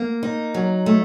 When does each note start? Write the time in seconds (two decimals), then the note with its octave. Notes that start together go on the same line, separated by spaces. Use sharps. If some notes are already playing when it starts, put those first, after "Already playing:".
Already playing: A#3
0.23 D#4
0.54 F#3
0.86 A3